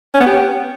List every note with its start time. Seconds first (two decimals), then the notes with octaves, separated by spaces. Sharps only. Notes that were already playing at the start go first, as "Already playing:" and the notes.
0.14 C#4
0.20 B3
0.26 G4